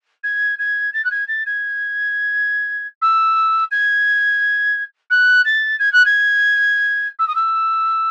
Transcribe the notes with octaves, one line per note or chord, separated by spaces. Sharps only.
G#6
G#6
A6
F#6
G#6
A6
G#6
E6
G#6
F#6
A6
G#6
F#6
G#6
E6
D#6
E6